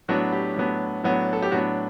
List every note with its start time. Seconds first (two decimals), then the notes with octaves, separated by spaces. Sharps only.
0.08 A2 F#3 B3 D4 F#4
0.33 G4
0.56 A2 F#3 B3 D4
1.04 A2 F#3 B3 D4
1.33 A4
1.42 G4
1.52 A2 F#3 B3 D4 F#4